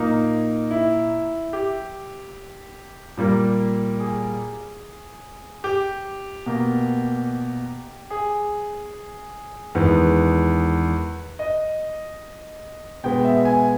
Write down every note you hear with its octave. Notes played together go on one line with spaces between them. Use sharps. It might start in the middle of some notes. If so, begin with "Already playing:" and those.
Already playing: A#2 A#3 D#4
E4
G4
A#2 G3 A#3
G#4
G4
B2 A#3
G#4
E2 D#3 G#3 B3 B4
D#5
B2 G#3 B3 G5
E5
G#5